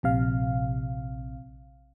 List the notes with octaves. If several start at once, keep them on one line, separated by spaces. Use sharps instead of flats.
A#1 C3 F5